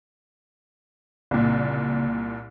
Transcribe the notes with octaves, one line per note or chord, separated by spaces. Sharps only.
C2 A#2 C#3